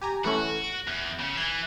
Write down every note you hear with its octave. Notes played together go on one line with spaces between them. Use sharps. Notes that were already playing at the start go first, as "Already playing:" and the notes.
G4 G#5 A#5
E3 A3 C#4 F#4
D7
E2
C#3 C#4
E3 G#5 C7